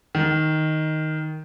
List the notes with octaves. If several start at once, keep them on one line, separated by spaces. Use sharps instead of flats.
D#3